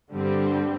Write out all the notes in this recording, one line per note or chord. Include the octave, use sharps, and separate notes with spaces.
G2 D3 G3 C4